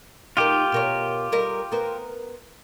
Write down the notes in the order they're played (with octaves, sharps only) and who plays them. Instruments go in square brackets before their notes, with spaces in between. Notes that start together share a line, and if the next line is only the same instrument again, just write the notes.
[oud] D#4 A#4 [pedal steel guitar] F4 G4
[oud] B2 A#4 C#5
G3 A#4 D#5
B3 A#4 C5